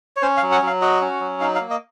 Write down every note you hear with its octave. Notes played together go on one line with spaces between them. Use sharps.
C#5
C#4 C5
F5
F#3
F#5
F#3 F5
F#4 D#5
C#4
F#3
D#4 F5
F5
A#3
D#5